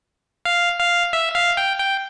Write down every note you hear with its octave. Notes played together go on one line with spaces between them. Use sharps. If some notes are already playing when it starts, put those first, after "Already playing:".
F5
F5
E5
F5
G5
G5